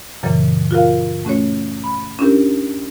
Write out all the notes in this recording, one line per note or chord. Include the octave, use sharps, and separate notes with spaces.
F#2 A#2 C#3 E3 F#3
F4 F#4 A#4 F5
A3 C#4 F#4 C#5
B5
C#4 D4 E4 G4 A#4